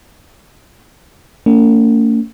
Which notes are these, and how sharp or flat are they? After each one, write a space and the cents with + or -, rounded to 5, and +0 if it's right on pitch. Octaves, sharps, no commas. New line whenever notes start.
A#3 -45 C#4 +40